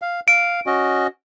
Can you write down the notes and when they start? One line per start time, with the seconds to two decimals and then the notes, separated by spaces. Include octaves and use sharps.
0.02 F5
0.28 F5 D7
0.67 C#4 F#4 D#5